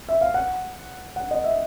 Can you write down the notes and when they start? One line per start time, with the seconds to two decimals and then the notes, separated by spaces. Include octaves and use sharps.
0.09 E5
0.21 F5
0.34 F#5
1.16 F#5
1.31 D#5
1.44 E5